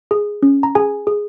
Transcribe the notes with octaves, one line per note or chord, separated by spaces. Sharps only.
G#4
C#4
A#5
G#4 G#5
G#4